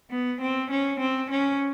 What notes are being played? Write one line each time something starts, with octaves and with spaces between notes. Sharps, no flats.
B3
C4
C#4
C4
C#4